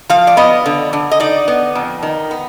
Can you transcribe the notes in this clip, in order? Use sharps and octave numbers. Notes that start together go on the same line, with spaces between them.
F3 F5
D5
B3 D#5
D3
D3
D#5
D#4 D5
B3
F2
D#3
B3